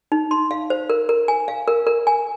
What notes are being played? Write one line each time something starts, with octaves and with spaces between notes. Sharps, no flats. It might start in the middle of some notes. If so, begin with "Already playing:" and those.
D#4
C6
F5
C5
A#4
A#4
G#5
F5
A#4
A#4
G#5